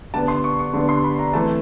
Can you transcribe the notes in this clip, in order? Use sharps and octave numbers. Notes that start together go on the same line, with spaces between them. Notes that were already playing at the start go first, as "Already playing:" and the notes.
D3 G3 B3 A5
C6
C#6
C#6
D3 G3 B3
C6
B5
A#5
C3 E3 A3 A5